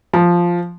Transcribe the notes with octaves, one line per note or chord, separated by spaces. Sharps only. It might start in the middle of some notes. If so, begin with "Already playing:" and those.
F3